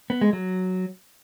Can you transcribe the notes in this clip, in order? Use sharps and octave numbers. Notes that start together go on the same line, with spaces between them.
B3
G#3
F#3